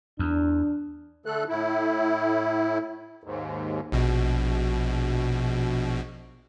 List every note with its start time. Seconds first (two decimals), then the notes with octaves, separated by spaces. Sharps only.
0.19 E2 D4
1.26 D3 A3 A4 F#6
1.49 A2 E4
3.24 D#2 G#2
3.92 A#1 B2